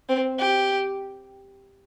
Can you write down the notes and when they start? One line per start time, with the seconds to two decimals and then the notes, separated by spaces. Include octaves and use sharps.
0.09 C4
0.39 G4